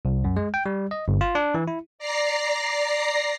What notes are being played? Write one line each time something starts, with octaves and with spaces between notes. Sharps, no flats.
C2
F#2
G#3
G5
G3
D#5
G1
F4
D4
E3
E4
D5 A#5 A#6 C7